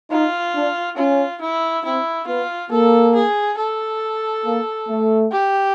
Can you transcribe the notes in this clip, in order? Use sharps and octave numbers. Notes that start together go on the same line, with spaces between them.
D#4 F4
D4
C#4 F4
E4
C4 E4
B3 F4
A#3 A4
G#4
A4
A#3
A3
G4